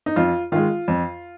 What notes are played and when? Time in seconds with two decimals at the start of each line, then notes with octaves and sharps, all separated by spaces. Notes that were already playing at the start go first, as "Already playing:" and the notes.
0.06 D#4
0.16 F2 F4
0.52 D#3 G#3 F4
0.88 F2